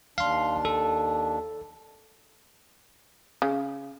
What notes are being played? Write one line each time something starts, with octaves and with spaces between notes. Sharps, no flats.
D#2 D4 F5 C6
A4
C#3